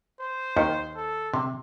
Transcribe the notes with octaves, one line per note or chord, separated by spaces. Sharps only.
C5
D#2 D#3
A4
C3